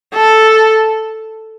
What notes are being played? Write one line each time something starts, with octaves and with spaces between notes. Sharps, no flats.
A4